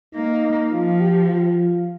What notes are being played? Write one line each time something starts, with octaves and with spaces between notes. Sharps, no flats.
A#3 D#4
F3 F4
G4
F4